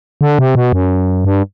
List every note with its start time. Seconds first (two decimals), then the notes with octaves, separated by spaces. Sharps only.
0.21 D3
0.39 C3
0.55 B2
0.73 F#2
1.25 G2